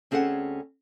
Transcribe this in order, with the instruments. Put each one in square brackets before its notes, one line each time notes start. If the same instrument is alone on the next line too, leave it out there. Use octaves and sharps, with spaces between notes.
[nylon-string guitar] D2 C4 C#4 G#4 A4 F#5